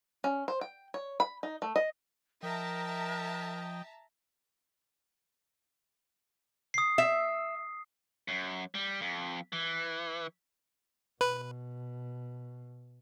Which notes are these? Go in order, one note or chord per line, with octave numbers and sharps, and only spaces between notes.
C#4
C5
G5
C#5
B5
D#4
A3
D#5
F3 A#4 D#5 E5 G5 A5 A#5
D#6 C7
E5
F#2
G3
F2
E3
B2 B4